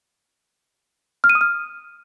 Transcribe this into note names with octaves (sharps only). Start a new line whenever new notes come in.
F6
D#7
D#6
F6